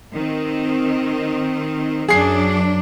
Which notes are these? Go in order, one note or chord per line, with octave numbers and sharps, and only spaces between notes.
D#3 C4
F#2 F#3 D4 G#4 C7